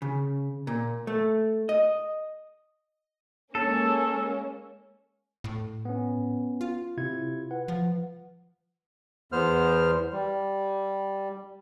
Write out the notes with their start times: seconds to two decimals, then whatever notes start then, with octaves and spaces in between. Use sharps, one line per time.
0.02 C#3
0.67 A#2
1.07 A3
1.69 D#5
3.55 G#3 A#3 C#4 A4
5.44 A2
5.85 B3 C#4
6.61 F4
6.97 C3 E4 G#6
7.51 B4 F#5
7.68 F3
9.32 E2 B3 C5 F6
10.13 G3